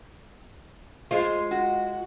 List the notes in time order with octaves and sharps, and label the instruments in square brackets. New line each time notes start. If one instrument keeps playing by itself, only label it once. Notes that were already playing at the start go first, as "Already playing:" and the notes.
[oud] G#3 F4 [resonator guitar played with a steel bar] C5
[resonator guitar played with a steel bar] F#4